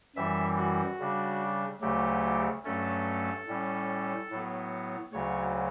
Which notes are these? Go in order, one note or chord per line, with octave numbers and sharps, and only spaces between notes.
F#2 E3 G3 E5
F#4
C#3 G3 D4
D2 C#3 F#3 A3 G4
G2 F#3 A3 C#4 A4
A2 G3 C#4
A2 F#3 B3
D2 C#3 F#3 C#5